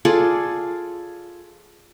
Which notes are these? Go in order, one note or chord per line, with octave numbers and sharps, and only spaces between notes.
F4 G#4 A4 D5